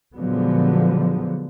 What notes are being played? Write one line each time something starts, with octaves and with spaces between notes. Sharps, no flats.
A#2 D3 F3 F#3 G#3 B3